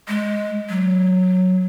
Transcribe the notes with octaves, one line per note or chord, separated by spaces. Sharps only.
G#3
F#3